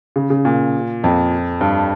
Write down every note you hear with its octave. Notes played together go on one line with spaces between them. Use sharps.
C#3
C#3
A#2
F2
G2